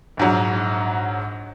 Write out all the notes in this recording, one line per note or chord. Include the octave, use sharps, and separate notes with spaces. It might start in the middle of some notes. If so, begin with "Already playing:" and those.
A#1 G#2 F#3